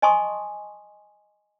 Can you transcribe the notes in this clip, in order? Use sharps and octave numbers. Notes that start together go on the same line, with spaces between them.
D#5 G#5 A5 C6 C#6 D#6